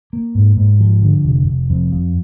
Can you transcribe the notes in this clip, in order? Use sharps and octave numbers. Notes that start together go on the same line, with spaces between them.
A#3
G#2
G#2
F3
D3
F1
F1
F2
F3